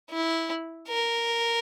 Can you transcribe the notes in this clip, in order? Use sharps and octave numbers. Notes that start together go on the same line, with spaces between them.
E4
A#4